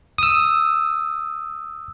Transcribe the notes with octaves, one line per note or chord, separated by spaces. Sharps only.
D#6 E6